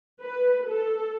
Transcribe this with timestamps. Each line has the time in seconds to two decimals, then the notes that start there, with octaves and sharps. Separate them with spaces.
0.22 B4
0.69 A4